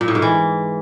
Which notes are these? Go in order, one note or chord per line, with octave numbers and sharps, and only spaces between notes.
A#2
A2
G#2
E3